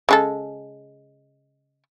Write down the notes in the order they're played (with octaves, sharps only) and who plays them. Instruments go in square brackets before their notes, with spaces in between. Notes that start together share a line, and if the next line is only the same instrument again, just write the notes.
[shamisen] C#3 G#3 A4